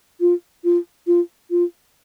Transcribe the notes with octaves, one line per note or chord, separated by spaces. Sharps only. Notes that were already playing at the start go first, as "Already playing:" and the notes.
F4
F4
F4
F4